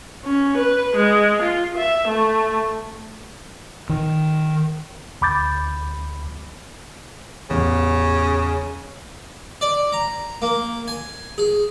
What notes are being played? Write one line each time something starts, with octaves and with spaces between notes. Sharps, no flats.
C#4
B4
G#3
F4
E5
A3
D#3
D2 B5 D6 G6 A6
A1 E2 C#3
D5
A#5
A#3
G#5
G#4